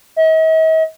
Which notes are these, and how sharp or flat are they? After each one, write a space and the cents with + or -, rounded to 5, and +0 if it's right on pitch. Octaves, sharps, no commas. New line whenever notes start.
D#5 +45